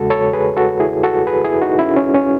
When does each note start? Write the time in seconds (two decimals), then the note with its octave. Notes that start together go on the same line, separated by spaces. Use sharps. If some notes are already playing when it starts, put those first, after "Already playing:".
Already playing: E2 C#3 G#3 F#4 A4
0.10 A4 C#5
0.33 G#4 B4
0.57 F#4 A4
0.80 E4 G#4
1.03 F#4 A4
1.27 G#4 B4
1.45 E4 G#4
1.62 D#4 F#4
1.79 C#4 E4
1.97 C#4
2.15 C#4